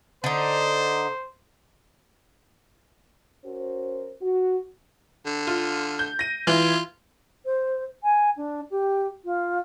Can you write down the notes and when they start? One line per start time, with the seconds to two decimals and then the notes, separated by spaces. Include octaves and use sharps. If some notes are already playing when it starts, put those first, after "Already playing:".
0.24 D3 D#4 C5
3.44 C#4 F#4 A#4 C5
4.22 F#4
5.26 D3
5.47 F4
5.99 G6
6.19 A#6 D#7
6.47 E3 F4
7.45 C5
8.03 G#5
8.36 D4
8.70 G4
9.24 F4